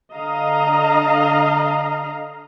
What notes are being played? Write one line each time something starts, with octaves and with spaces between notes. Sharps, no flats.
D3 D#5 F5 A#5